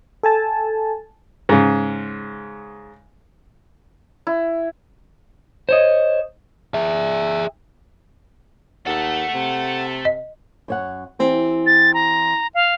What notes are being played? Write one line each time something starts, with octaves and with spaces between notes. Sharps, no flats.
A4 G#5 A5
G#2 C#3
E4
C5 C#5 D#5
G#4 E5
D#2 A4 E5 F#5
C3
D#5
F#2 C#5 F#5
E3 C4 G4
A6
A#5
F5